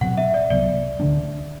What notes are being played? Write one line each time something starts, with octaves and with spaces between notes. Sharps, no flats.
B2 F#3 C4 F#5
E5
D5
C2 C3 F#3 B3 D5
D2 D3 G3 D4